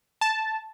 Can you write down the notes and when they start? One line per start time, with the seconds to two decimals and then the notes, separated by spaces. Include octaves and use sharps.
0.21 A5